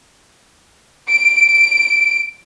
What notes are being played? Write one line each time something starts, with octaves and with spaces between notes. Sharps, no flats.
D7